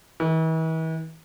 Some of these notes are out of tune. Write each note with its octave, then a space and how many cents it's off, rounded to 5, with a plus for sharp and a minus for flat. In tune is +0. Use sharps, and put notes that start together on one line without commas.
E3 -40